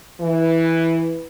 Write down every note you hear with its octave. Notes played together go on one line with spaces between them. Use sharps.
E3